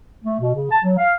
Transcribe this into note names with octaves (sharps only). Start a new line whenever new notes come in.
A3
B2
C#3
A5
F#3
F5